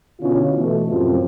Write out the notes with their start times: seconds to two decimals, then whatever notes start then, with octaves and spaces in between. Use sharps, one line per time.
0.20 B2 D3 C#4 E4 F4
0.56 B2 E3 A3
0.88 F#2 A2 C3 F3